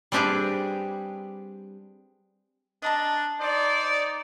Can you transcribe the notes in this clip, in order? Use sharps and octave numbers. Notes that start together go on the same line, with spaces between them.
G3 C4 D4 G4 G#4 B4
D4 D#5 A5 A#5
D#4 C5 D5